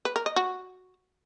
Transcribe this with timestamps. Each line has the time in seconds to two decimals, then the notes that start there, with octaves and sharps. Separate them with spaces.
0.05 B4
0.16 A#4
0.26 D#5
0.36 F#4